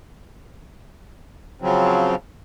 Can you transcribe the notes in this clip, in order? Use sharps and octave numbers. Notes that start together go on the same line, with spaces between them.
C#3 F3 F#3 C4